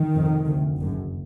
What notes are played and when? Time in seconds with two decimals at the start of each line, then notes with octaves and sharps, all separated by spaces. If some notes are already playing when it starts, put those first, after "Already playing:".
Already playing: D#3
0.14 F1 F2
0.46 D2
0.79 F#1 F#2